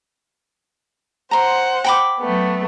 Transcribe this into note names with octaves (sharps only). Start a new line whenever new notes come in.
C5 F#5 A#5 C6
G5 B5 D6
F#3 A3 B3